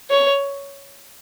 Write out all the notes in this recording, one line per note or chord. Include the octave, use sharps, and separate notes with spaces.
C#5